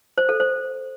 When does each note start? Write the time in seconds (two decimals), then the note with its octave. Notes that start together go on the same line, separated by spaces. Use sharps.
0.18 C5
0.29 A4
0.40 C5